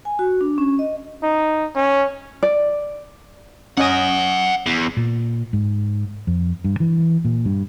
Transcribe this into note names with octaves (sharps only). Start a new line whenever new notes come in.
G#5
F#4
D4
C#4
D#5
D#4
C#4
D5
C#4 D#5 F#5 G#5 D#6
E2
A#2
G#2
F2
G2
E3
A#2
G2